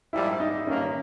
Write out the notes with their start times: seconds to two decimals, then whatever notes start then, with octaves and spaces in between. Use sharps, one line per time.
0.13 A#1 G#2 G3 E4
0.40 D#4
0.67 G2 D#3 A#3 C#4